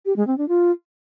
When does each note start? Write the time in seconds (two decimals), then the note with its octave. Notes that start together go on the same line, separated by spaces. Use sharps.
0.06 G4
0.16 G#3
0.27 C4
0.38 D4
0.48 F4